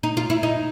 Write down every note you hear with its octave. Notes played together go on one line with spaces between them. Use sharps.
D#4
F4
E4
D#4